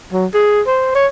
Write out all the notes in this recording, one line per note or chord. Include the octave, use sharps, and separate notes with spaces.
F#3
G#4
C5
C#5